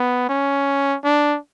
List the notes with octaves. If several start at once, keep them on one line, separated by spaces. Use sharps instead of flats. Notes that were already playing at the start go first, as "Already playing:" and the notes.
Already playing: B3
C#4
D4